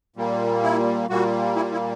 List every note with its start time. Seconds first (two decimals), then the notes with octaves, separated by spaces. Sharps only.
0.16 A#2 G3 A#3
0.63 E4
1.09 A#2 G3 A#3 F#4
1.56 E4
1.73 E4